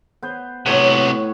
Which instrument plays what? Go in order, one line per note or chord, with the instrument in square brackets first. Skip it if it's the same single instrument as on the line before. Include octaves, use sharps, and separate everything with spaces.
[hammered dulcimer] B3 C5
[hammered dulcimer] A2 C#5 F#5 [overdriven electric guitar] C3 B3